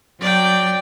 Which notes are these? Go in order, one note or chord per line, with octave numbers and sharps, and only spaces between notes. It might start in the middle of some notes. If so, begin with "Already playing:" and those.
F#3 D5 G5